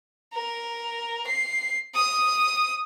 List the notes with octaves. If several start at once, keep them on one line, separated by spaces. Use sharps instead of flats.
A#4
C7
D#6